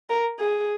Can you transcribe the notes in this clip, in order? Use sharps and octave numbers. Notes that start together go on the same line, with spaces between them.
A#4
G#4